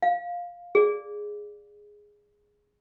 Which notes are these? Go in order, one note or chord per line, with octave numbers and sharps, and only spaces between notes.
F5
G#4 D5